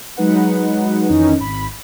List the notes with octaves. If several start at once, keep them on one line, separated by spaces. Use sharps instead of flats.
F#3 G#3 D#4 B4 F#5
F2 D#3 E3 C#4 D#4
G#1 B5